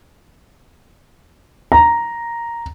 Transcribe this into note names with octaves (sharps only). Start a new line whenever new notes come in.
A#5